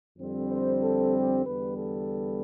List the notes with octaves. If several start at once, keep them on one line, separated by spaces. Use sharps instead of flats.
F2 D3 G3 C4
C5
A4
G4
E2 D3 G3 B3 B4
A4